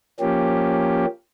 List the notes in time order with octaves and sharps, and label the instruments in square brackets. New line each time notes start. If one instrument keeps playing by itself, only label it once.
[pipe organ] F3 A#3 C#4 G4